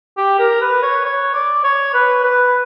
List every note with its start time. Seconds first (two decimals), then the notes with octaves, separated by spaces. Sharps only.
0.17 G4
0.39 A#4
0.61 B4
0.83 C#5
1.05 C#5
1.34 D5
1.64 C#5
1.94 B4
2.24 B4